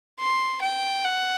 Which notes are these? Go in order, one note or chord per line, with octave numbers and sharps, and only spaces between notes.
C6
G5
F#5